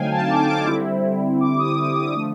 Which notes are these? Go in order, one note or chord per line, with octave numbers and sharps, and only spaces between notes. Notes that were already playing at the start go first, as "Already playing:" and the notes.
Already playing: D3 F#3 A3 C4 D#4 F5 G5 G#5
A5
D6
D6
D3 G3 C4 E4
D6
D#6
D#6
D#6
D3 F3 A3